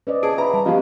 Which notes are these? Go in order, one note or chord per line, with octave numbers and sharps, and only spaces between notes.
C#4 B4 C5 D5 D#5
G#4 A5 D7
B4 E5 A#5 B5
G3 A5
F3 B3 C#4 G4 D#5 F5